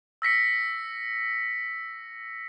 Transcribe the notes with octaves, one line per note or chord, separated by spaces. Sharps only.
E6 A#6 B6 C#7